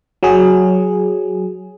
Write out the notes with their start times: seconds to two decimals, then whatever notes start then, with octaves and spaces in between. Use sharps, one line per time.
0.23 F#3 G#4